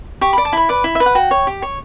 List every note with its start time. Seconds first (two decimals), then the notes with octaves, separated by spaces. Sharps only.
0.21 G4 C#6
0.33 D5 B5
0.45 A5
0.53 E4 B5
0.69 B4 D5
0.84 E4
0.95 E5
1.00 B4 D5
1.06 F#5
1.15 F#4 G5
1.31 C#5
1.47 G4
1.62 C#5